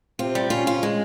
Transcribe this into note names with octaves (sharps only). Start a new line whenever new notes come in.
C3 C4 F4
G3
C#3 C#4 F4
F4
G#3